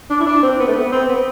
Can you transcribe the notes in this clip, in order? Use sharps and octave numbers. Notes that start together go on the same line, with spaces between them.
D4
E4
D4
C4
B3
A3
B3
C4
B3